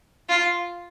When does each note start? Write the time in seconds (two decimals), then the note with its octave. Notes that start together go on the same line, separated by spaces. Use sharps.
0.29 F4